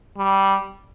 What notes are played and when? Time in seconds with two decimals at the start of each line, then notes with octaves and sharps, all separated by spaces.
0.18 G3